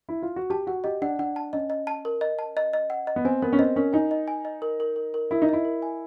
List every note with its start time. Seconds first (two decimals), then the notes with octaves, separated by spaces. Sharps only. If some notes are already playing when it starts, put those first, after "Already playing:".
0.09 E4
0.23 F4
0.36 F#4
0.50 G4 A5
0.67 F#4 F#5
0.84 G4 D#5
1.02 D4 F#5
1.19 D4 F#5
1.36 A5
1.53 C#4 D#5
1.70 D#5
1.87 A5
2.05 A#4
2.21 D#5
2.39 A5
2.57 D#5
2.73 D#5
2.90 F#5
3.07 D#5
3.16 B3
3.25 C4 G#5
3.42 B3 A#4
3.53 C#4
3.59 C4 D#5
3.76 C#4 A#4
3.93 D#4 G#5
4.11 D#5
4.28 G#5
4.45 D#5
4.62 A#4
4.80 A#4
4.96 A#4
5.14 A#4
5.31 E4 A#4
5.42 D#4
5.49 E4 D#5
5.65 A#4
5.82 G#5